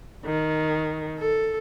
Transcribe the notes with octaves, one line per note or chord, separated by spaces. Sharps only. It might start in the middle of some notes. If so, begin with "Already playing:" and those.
D#3
A4